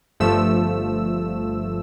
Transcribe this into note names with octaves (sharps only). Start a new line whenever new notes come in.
G1 G2 F3 A3 E6